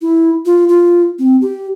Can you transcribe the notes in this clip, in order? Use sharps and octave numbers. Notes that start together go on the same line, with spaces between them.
E4
F4
F4
C4
G4